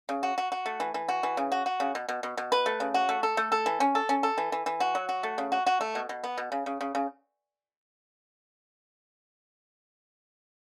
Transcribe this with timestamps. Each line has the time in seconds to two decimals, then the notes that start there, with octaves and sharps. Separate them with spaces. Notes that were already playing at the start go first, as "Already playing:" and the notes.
0.09 C#3
0.23 F#4
0.38 F#4
0.52 F#4
0.66 A3
0.80 E3
0.94 E3
1.09 F#4
1.23 E3
1.37 C#3
1.52 F#4
1.66 F#4
1.80 C#3
1.95 B2
2.08 B2
2.23 B2
2.37 B2
2.52 B4
2.66 A3
2.80 C#3
2.94 F#4
3.09 A3
3.23 A4
3.37 A3
3.52 A4
3.66 E3
3.80 C#4
3.95 A4
4.09 C#4
4.23 A4
4.38 E3
4.52 E3
4.66 E3
4.80 F#4
4.95 F#3
5.09 F#4
5.23 A3
5.38 C#3
5.52 F#4
5.66 F#4
5.81 A3
5.95 B2
6.09 B2
6.24 B3
6.38 B2
6.52 C#3
6.66 C#3
6.81 C#3
6.95 C#3